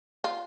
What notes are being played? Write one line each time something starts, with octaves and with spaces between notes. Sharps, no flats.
F4